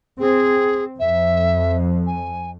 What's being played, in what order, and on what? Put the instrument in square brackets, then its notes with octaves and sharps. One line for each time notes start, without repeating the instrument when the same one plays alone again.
[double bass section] C4 [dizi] G#4
[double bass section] F2 [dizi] E5
[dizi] G#5